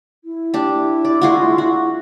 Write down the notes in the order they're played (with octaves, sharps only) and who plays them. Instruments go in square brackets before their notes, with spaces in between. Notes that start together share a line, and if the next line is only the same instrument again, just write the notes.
[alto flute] E4
[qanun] D4 G4
[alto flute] E4
[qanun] D5
G#3 F4 F#4
F#4